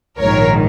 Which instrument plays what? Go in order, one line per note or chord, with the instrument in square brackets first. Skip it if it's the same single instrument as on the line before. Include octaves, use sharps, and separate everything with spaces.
[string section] A#1 G#2 D#3 A#4 C#5